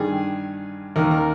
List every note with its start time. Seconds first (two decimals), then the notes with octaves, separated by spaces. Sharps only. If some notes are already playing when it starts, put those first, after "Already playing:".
Already playing: G2 D#3 G#4
0.96 D#2 D#3 A#4
1.11 A#4